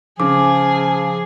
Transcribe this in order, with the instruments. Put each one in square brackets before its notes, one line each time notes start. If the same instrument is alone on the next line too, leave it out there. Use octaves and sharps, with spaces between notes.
[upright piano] C#3 [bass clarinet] F3 [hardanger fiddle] G#4 [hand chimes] D6